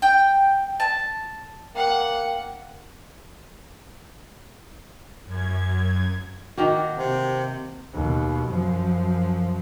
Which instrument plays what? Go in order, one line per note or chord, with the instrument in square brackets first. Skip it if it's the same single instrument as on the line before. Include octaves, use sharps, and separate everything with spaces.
[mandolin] G5
A5
[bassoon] A#3 [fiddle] F#5 [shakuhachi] G5
[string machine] F#2 G#6
[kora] D#3 A#3 F#4
[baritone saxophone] C3
[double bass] D#2 B2
F#2 F3